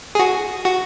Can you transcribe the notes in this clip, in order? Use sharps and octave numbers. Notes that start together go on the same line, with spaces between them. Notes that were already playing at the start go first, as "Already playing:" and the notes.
G#4
F#4
F#4